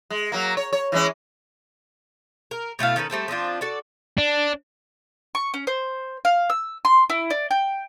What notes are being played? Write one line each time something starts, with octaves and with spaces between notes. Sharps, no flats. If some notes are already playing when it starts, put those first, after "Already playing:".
G#3
F#3 A#3
C#5
C#5
E3 G#3 C#4
A#4
B2 A3 E4 F5
D#3 C#4 A4 B4
G3 A3 C4 A4
F3 C4 D4 F4
F#4 A4 D5
D4
C#6
C#4
C5
F5
E6
C6
E4
D5
G5